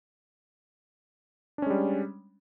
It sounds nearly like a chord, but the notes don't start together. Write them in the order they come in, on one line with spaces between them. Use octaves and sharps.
D4 C#4 G#3 G3